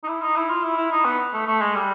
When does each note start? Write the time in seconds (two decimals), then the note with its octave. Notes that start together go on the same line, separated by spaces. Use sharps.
0.04 D#4
0.08 E4
0.22 D#4
0.36 E4
0.50 F4
0.64 E4
0.77 E4
0.92 D#4
1.05 B3
1.33 A3
1.47 A3
1.61 G#3
1.75 G3